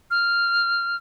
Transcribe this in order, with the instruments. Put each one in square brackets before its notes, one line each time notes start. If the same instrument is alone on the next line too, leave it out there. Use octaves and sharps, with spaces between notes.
[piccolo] F6